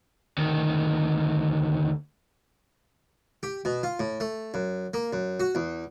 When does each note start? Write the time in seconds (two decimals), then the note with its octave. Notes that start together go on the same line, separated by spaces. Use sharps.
0.38 D2 D#3
3.43 G4
3.65 B2
3.83 F4
3.99 A2
4.20 A3
4.54 F#2
4.94 A#3
5.13 F#2
5.40 F#4
5.55 E2